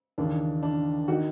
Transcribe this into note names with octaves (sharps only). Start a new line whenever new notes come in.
D#2 C#3 E3 D4
D4
D#3 F#4